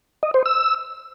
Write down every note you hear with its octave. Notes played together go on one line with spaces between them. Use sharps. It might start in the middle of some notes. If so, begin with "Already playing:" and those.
D#5
C5
E6